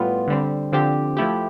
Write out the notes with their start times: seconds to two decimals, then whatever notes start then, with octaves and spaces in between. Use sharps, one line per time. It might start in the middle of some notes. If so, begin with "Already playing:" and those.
Already playing: A2 G3 B3 F4
0.28 D3 G3 C4
0.72 D3 F3 C4 G4
1.17 F3 A3 E4 G4